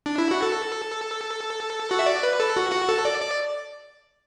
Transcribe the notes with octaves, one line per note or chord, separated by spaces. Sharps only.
D4
E4
F#4
A4
F#4
E5
D5
B4
A4
F#4
F#4
A4
D5
D5